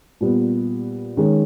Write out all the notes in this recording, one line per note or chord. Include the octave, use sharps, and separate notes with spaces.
A#2 G3 B3
D#3 G#3 C#4